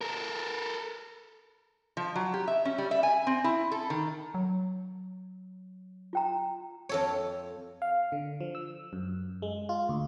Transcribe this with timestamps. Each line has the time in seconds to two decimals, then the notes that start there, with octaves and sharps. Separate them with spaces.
0.01 A4 A#4
1.97 F3
2.16 F#3
2.34 G4
2.48 E5
2.65 C#4
2.78 G3
2.91 E5
3.03 G#5
3.27 C4
3.44 E4
3.72 A4
3.90 D#3
4.34 F#3
6.13 F4 G5 A#5
6.89 F2 A4 C#5
7.82 F5
8.12 D3
8.41 F3
8.55 E6
8.93 F#2
9.42 G#3
9.69 F4
9.89 D2